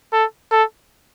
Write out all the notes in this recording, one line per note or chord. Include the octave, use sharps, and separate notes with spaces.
A4
A4